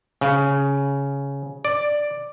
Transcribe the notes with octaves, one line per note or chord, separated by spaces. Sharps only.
C#3
D5